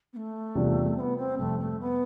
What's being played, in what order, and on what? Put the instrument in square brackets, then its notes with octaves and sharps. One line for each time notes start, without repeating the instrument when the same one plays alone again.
[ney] B3
A3
[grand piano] E2 C3 G3 D4 F4
[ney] C4
B3
C4
[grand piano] F2 C3 G3 [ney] A3
[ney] A3
B3